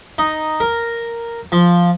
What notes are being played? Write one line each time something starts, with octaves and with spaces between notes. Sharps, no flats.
D#4
A#4
F3